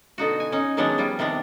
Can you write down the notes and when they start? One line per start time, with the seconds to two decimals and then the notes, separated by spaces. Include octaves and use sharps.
0.18 B2 D3 D#4 F#4
0.40 G#5
0.52 C#4 D#4
0.77 D#3 F#3 G#3 B3 C#4 D4
0.98 F3 G3 F4
1.19 C3 D#3 B3 D4